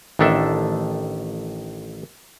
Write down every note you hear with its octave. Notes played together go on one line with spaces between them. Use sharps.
A1 D#3 D4 A4 E5